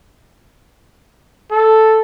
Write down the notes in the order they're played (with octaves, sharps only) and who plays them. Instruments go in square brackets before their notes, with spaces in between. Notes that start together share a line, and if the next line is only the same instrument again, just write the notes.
[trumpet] A4